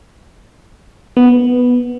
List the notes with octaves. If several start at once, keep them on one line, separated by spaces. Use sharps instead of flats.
B3